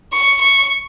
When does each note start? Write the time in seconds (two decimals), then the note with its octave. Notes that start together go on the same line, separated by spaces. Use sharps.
0.13 C#6
0.41 C#6